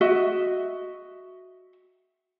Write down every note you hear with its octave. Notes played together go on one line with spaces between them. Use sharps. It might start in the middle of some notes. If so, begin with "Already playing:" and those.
F#4 D#5 E5